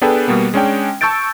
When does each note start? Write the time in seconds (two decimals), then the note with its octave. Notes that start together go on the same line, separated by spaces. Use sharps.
0.01 B3 D4 G#4 A4 B4 G5
0.28 B2 G3 A#3 B3
0.54 G#3 C#4 D4 G5
1.01 A5 C#6 E6 G6 A6 D7